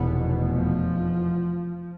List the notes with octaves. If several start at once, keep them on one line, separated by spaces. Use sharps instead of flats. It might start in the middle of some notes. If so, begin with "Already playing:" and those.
Already playing: F1 E2 B2 B3
F3